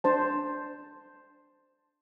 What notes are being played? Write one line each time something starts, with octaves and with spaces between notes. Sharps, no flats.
D4 C5 A5